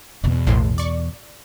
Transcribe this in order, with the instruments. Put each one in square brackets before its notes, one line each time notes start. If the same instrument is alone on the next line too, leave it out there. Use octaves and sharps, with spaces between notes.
[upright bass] E2 B2
[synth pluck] A#1 A2 C6
D5 C#6